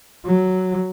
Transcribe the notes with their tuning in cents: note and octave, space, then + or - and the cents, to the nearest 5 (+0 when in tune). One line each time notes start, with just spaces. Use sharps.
F#3 +5